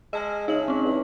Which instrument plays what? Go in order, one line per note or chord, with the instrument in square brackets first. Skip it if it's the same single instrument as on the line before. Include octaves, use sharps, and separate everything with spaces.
[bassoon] G#3 [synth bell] D#5 A5 F6
[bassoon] C#3 [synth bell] D#4 F#7
[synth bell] C4 C#4
[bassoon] E2